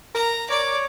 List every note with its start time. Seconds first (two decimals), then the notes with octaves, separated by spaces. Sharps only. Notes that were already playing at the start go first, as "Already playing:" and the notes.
0.15 A#4 A#5
0.50 A#4 C#5 D5 D6